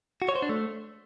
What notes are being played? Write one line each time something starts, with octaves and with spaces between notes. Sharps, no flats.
F#4
C#5
C5
D4
A3